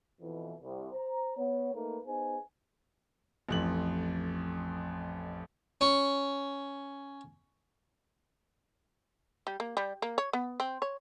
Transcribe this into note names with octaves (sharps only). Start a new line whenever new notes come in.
F2 B2 E3
C2
C5 A#5
B3 C#5
A3 A#3 D#4 B4
B3 D#4 G#4 C5 G#5
A1 F2 F#7
C#4 C#6
G3
A#3
G3
A#3
C#5
B3
C4
C#5